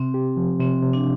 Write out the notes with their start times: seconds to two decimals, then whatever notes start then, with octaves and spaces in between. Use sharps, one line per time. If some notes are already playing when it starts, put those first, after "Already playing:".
Already playing: C3 C4
0.14 G4
0.37 F3
0.60 C3 C4
0.82 C3
0.93 D4